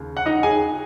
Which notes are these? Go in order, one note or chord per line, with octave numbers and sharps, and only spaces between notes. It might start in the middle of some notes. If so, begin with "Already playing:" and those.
Already playing: D#2 C#3
F#5
D#4 D#5
G#4 G#5